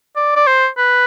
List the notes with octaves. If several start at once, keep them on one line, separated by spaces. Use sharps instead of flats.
D5
D5
C5
B4